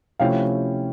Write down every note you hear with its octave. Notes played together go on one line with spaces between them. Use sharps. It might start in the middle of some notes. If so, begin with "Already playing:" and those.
C3 F3 A3 C#4 E4 F5 G5